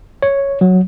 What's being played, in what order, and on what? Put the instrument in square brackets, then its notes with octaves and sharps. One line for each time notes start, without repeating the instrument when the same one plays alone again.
[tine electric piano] C#5
F#3